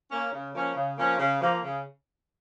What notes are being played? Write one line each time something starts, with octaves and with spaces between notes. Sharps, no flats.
A#3 C#4
C#3
F3 A#3 C#4
C#3
F3 A#3 C#4
C#3
F3 A#3
C#3